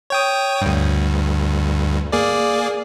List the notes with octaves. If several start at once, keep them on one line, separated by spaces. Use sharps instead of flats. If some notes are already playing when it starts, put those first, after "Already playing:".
C#5 G5 D#6
D2 G2
A#3 G#4 D5